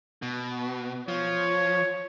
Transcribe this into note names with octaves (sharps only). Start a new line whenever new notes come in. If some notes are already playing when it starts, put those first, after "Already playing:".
B2
F3 C#5